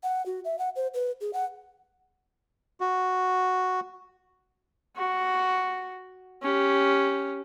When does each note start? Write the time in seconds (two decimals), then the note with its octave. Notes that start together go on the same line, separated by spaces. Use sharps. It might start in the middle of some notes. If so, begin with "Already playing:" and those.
0.03 F#5
0.26 F#4
0.45 E5
0.59 F#5
0.76 C5
0.94 B4
1.21 G#4
1.33 F#5
2.81 F#4
4.97 F#4
6.42 C#4 G4